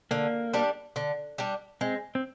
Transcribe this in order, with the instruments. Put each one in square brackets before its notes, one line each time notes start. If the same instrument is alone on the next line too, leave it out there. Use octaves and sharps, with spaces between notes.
[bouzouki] D3 [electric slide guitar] A#3
[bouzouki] G3 D4
D3
G3 D4
[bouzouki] G#3 [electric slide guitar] C4
[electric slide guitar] C4